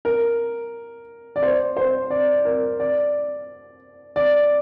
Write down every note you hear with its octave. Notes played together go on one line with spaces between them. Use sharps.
A#4
D5
C5
C5
D5
A#4
D5
D5